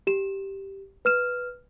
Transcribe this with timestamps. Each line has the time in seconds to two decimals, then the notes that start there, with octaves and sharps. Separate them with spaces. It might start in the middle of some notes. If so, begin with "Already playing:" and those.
0.07 G4 E7
1.05 B4 F6 E7